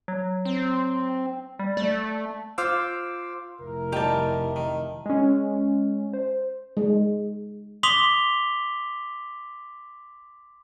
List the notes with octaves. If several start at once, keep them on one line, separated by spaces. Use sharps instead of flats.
F#3
C4
G3
A3 D5
F4 C5 F5 D6 E6
F1 E4 A#4
D#3 G3 G4 A5
D#3
G#3 C#4
C5
G#3
C6 D6 D#6 B6 F7 G7